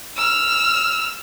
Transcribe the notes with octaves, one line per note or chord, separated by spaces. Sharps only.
E6 F6